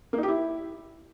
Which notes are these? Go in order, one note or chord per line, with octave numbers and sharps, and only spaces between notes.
A#3
D#4
G4
E4